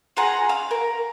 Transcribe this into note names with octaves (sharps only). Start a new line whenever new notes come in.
F4 G#4 F#5 A#5
F5
A#4